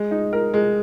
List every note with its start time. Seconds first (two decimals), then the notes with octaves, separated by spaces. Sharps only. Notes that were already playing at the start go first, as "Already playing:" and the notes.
Already playing: G#3
0.11 D#4
0.33 A#4
0.54 G#3